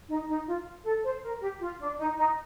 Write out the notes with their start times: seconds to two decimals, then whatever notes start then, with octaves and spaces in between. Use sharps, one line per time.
0.09 D#4
0.27 D#4
0.47 F4
0.84 A4
1.04 C5
1.23 A#4
1.40 G4
1.60 F4
1.79 D4
1.97 D#4
2.16 D#4